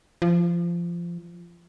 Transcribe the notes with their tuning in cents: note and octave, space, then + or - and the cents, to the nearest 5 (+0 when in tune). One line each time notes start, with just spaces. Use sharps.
F3 -20